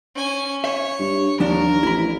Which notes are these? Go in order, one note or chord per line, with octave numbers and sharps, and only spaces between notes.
C#4 G#5
C#5 E5
G2
D#2 F3 D4 A#4
A1 E4 B5